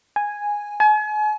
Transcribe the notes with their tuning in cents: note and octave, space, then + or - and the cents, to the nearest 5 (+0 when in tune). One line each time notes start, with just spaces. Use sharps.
G#5 -5
G#5 +40